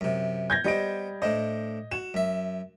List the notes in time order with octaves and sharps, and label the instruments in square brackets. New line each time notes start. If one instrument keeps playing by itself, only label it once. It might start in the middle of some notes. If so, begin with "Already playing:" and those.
[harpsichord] F#2 C3
[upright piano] G6 G#6 A#6
[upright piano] G3 D#5 D7 [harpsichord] B3 C5
[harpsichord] A2 D4 C5 [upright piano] D#5
[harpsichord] F#4 [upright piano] E7
[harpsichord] F#2 E5